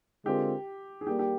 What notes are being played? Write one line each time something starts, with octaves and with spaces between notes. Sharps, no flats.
D3 G#3 C4 F4 G4 A#4
G#4
G3 A#3 G4
G4